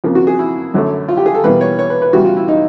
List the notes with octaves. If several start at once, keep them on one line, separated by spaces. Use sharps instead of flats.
F2 C#3 F3 A#3
F#4
G#4
E4
F#2 D3 F#3 A3
F4
G4
G#4
A4
E2 B2 G3 A#3 B4
C#5
C#5
B4
B4
E2 C#3 E3 G3 F#4
F4
E4
D#4